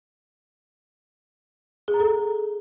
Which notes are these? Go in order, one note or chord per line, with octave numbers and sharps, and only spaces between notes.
G#4
A#5
A4